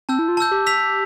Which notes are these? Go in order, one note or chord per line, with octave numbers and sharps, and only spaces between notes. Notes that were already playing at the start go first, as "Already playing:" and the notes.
C4 A5 E6 G6
E4
F4
A5 E6 G6
G4
E6 B6 F7